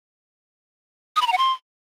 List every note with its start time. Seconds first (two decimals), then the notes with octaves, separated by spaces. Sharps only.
1.16 D#6
1.21 B5
1.27 A#5
1.32 F#5
1.38 C6